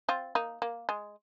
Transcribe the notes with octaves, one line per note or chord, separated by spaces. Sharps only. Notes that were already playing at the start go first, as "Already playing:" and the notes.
C4 F4
A#3 D#4
A#3
G#3